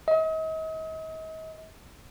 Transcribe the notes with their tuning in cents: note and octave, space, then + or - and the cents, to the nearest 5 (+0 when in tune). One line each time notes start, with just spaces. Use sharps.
D#5 +40